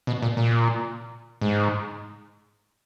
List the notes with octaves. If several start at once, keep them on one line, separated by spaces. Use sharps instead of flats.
B2
A#2
A#2
G#2